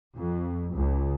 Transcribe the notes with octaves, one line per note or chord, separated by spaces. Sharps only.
F2
C#2